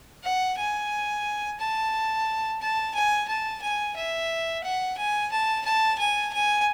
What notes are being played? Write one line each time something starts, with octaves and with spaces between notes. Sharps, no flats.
F#5
G#5
A5
A5
G#5
A5
G#5
E5
F#5
G#5
A5
A5
G#5
G#5